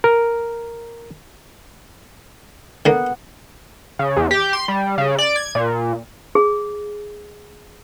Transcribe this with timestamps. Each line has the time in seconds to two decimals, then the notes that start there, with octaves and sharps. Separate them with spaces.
0.04 A#4
2.86 D3 A#3 B3 F#5
3.99 C#3
4.17 E2
4.31 G4
4.53 C6
4.68 G3
4.98 C#3
5.19 D5
5.36 G#6
5.55 A#2
6.35 G#4